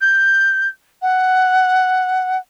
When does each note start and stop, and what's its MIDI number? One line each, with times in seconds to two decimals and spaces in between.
0.01 0.67 91
1.02 2.37 78